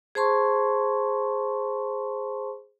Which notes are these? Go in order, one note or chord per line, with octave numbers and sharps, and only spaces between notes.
G#4 C5 A5 C6 C#6